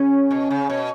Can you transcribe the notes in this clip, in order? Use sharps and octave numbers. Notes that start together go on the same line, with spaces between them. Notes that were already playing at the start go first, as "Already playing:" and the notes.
Already playing: C#3 C#4
B2
C#3
B2